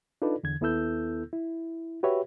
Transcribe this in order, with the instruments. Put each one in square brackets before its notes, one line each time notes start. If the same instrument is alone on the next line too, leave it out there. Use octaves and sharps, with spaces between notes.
[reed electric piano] D4 D#4 F4 A4 B4 D5
E2 D3 G#6
D#2 B3 E4 A4 E6 G6
E4
F#4 G4 B4 C#5 E5